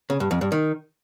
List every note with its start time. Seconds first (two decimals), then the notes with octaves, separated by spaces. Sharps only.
0.10 C#3
0.20 G2
0.31 F2
0.41 G2
0.52 D#3